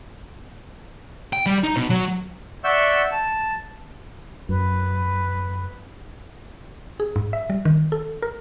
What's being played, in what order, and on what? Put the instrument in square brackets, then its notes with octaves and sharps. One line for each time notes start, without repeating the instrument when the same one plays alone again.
[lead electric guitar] G5
G3
D#4
B2
F#3
[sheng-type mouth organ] D5 E5 F#5 C#6 E6 G6
A5
[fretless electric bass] F#2 [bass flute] B4
[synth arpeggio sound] G#4
G#2
E5
G3
D#3
A4
A#4